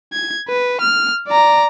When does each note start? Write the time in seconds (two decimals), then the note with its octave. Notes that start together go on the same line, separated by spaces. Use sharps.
0.13 G#6
0.48 B4
0.81 F6
1.28 D5 A#5